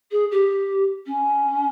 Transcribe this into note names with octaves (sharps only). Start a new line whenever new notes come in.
G#4
G4
C#4